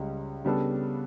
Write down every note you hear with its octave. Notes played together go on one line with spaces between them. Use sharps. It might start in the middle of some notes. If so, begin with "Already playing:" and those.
Already playing: C#2 C#3 G3
C#3 G3 B3 D4 A4